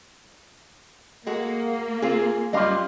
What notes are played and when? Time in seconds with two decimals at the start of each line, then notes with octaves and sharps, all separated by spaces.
1.27 G#3 A#3 F#4 A4
2.02 C4 F4 G#4
2.53 F#2 G3 F4 D#5 F5